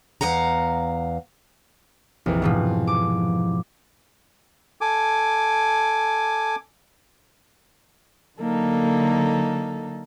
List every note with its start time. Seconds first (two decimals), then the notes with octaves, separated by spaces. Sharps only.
0.21 E2 F5 F#5 A#5
2.26 A#1 F2 C3 E3
2.42 G#2 B2 F3
2.87 D6
4.81 A4 G#5 D6
8.39 D3 F#3 A#3 D#4 A4